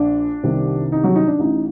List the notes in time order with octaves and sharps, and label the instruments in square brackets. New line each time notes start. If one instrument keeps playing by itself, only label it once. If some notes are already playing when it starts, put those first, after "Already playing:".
Already playing: [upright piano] A#1 D4
C2 C3 D#3
D#4
F#3 F#4
D#4
D4
A1 A2 D#4